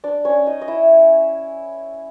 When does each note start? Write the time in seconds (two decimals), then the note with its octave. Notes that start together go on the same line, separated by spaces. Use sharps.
0.04 D4 D5
0.25 C#4 C#5
0.46 D#4 D#5
0.62 D#5
0.68 E4 E5